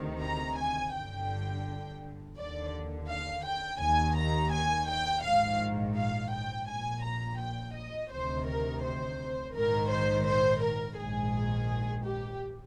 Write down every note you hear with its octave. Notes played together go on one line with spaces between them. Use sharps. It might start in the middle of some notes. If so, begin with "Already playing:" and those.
Already playing: D2 C3 D#3
A#5
G#5
G1 G2 D3 G5
D#2 D3 D5
F5
G5
D#2 D#3 G#5
A#5
G#5
G5
A#1 G#2 D#3 F5
F5
G5
A#1 A#2 G#5
A#5
G5
D#5
D2 C3 D#3 C5
A#4
C5
A#1 G#2 D#3 A#4
C5
C5
A#4
A#1 G#2 D#3 G#4
G4